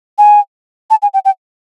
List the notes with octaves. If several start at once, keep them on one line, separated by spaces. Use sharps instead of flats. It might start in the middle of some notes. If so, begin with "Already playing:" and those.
G#5
A5
G#5
G5
G5